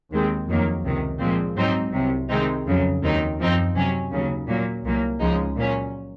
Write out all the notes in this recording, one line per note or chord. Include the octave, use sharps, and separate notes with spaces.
D#2 D#3 G#3 C4
F2 D#3 F#3 A#3
C#2 C3 D#3
A#2 F3 G#3 C4
G#2 F#3 C4 D#4
C2 C3 F#3
C3 D#3 G#3 C4 D#4
F2 C#3 F#3
D#2 D#3 F#3 C4 D#4
F#2 F3 C4 D#4
C3 F#3 C#4
D#2 C#3 F#3
A#2 F#3 A#3
C2 A#2 F#3 A#3
C#2 C#3 F3 G#3 D#4
A#2 F#3 C#4